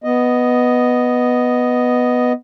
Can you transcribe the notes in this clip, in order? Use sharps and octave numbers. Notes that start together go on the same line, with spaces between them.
B3 D#5